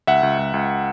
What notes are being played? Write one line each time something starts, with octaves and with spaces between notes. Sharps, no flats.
C#2 E5 F#5
C#2
C#2
C#2